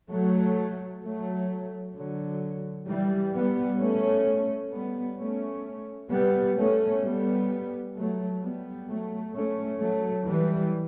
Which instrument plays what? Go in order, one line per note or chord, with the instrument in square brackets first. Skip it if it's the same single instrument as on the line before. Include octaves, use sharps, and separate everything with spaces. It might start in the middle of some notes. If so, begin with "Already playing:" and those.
[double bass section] F#3 A3
F#3 A3
D3 F#3
E3 G3
G3 B3
A3 C#4
G3 B3
A3 C#4
G3 B3
A3 C#4
G3 B3
F#3 A3
G3 B3
F#3 A3
A3 C#4
F#3 A3
E3 G3